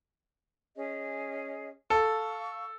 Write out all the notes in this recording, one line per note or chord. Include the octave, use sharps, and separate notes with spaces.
C#4 G#4 D#5
A4 F5 C#6 E6